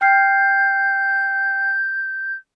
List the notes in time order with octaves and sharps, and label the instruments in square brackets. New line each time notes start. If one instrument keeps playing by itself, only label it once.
[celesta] G5 F6 C7 [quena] G6